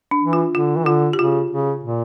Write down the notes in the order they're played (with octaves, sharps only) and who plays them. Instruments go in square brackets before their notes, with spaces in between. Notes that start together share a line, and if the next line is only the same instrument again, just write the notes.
[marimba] D4
[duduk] E3
[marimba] F4
[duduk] D3 [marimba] F4
[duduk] E3
[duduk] D3 [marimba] F4
[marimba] G4
[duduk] C#3 [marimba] F4
[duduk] C#3
A#2